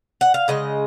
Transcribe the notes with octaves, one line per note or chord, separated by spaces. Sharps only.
F#5
F5
C#3 G#3 D#5